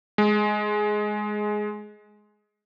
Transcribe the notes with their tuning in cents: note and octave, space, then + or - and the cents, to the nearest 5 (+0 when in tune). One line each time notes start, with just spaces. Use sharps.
G#3 +10